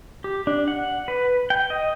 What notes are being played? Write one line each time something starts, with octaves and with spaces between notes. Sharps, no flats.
G4
D4
F#5
B4
G5
D#5